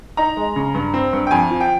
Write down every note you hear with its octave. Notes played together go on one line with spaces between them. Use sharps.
D#4 A#5
G#3
C#3
G2
C4
G2
G5
F2 G#5
F3
G5